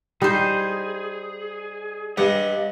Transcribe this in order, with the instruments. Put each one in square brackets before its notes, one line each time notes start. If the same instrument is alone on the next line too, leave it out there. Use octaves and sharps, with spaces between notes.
[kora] G3 [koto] D#4 C5 [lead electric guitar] G#4
[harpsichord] G2 [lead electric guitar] C#5 D#5 [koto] F#5